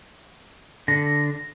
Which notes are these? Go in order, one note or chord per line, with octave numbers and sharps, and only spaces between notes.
D3 A#6